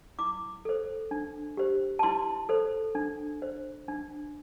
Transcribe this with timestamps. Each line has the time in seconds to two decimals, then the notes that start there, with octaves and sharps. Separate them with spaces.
0.19 E4 D6
0.65 A4 C5
1.11 D4
1.57 G4 C5
1.99 A5
2.03 E4 C6
2.49 A4 C5
2.95 D4
3.42 C5
3.88 D4